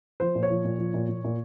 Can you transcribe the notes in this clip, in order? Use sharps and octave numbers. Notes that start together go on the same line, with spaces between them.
F3 C5
A#2
C#5
F3
A#2
F3
A#2
A#2
A#2